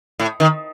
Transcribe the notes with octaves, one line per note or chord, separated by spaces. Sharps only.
A2
D#3